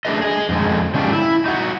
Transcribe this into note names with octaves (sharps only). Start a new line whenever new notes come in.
A3 D4 G#4 B4 D#5
G#4 D#5
F2 G#2 D3 G#3
D3 G#3 C#4 D4 F4 G4
E4
D#4 F#4